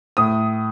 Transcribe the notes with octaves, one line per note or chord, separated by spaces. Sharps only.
A2 D#6